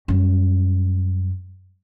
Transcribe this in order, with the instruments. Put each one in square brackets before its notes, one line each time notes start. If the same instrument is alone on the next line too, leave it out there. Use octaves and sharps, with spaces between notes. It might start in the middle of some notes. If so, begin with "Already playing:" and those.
[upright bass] F#2 G3